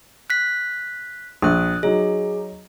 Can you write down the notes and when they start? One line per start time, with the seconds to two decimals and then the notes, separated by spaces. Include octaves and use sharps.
0.30 F#6 B6
1.42 A#1 D#6 F#6
1.83 F#3 D#4 G#4